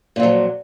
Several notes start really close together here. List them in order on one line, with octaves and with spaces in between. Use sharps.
A#2 F2 F#3